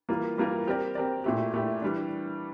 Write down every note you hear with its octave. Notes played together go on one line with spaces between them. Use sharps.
E3 G3 A#3 F4 A#4
E3 G3 A#3 F4 A#4
C4 G4 A#4 D5
C4 G4 A#4 D5
A#2 A3 E4 G4
A#2 A3 E4 G4
E3 G3 D4